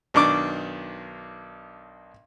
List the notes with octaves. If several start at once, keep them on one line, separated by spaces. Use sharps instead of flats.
B1 D#3 D4 C#6 D6